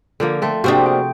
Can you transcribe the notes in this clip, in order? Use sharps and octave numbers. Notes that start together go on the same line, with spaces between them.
D3 F3 A#3
A3 C4
C3 A3 A#3 C4 D4 F#4 G#4
G5